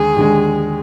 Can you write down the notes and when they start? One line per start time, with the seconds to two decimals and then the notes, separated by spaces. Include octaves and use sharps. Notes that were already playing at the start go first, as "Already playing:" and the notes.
Already playing: D#2 D3 G#3 G#4
0.16 D#2 D3 G#3